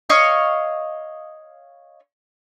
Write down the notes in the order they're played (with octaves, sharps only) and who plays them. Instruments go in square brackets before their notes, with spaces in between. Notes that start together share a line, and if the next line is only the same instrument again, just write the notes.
[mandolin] C#5 D#5 F5 C#6